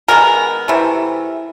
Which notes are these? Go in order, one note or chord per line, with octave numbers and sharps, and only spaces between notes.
D#3 G#3 B3 A#4
C3 E3 A3